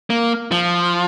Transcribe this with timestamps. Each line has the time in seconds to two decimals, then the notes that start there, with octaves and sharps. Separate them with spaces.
0.10 A#3
0.52 F3